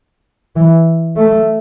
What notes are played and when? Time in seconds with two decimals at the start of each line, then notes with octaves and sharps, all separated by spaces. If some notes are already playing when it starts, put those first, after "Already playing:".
0.56 E3
1.16 A3